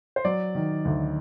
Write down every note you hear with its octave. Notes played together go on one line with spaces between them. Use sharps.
C5
F#3 D5
D#3
D2